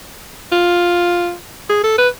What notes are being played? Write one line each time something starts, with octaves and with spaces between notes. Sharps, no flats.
F4
G#4
A4
B4